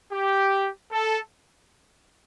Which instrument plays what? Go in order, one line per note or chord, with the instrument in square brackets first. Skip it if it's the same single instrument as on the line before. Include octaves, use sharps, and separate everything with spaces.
[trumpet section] G4
A4